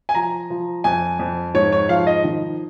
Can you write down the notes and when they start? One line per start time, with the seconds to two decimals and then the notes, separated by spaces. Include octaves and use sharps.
0.09 G#5
0.15 F3 A#5
0.50 F3
0.84 F2 G#5
1.19 F2
1.54 G#2 C#5
1.72 C#5
1.89 F3 F5
2.07 D#5
2.24 D#3